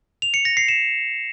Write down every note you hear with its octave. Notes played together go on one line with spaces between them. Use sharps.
F7
C#7
A#6
C7
E7